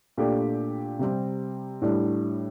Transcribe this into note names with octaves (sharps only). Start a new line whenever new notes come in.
A#2 A3 D4 G4
C3 G3 C4
A2 G3 D4